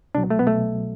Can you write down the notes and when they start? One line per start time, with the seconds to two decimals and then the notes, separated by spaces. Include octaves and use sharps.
0.15 C2 B2 F#3 D4
0.30 A3
0.39 B3
0.47 B2 A3